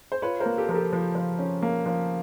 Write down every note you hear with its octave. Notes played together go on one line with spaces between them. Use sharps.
C5
F4 B4 C#5
A#4 C5
A#3
G4 A4
F3 A#4
G4 A4
F3
F3
C#4
A#3
F3